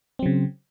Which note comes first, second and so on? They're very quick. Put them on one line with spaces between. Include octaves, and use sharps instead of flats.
C4 F#3 C#3